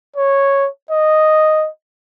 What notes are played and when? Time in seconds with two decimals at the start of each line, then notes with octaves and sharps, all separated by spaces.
0.16 C#5
0.91 D#5